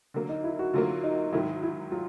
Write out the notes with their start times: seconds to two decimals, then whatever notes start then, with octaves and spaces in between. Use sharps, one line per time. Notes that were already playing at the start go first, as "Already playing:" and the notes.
0.14 D3 F#3 A#3
0.29 D#4
0.44 E4
0.59 F#4
0.74 D3 F#3 A#3 F4
1.04 D#4
1.32 G#2 D#3 F#3 E4
1.63 E4
1.92 F#3 F4